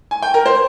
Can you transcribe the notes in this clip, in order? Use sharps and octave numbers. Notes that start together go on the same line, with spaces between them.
G#5
G5
A#4
C5